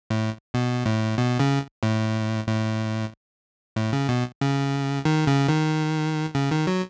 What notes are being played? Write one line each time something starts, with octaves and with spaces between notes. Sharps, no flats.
A2
B2
A2
B2
C#3
A2
A2
A2
C#3
B2
C#3
D#3
C#3
D#3
C#3
D#3
F#3